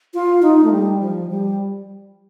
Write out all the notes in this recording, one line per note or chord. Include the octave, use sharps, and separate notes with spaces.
F4
D#4
A3
G3
F3
G3